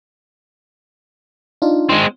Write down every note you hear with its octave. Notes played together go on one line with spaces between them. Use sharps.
D4 D#4 F4
G#3 C4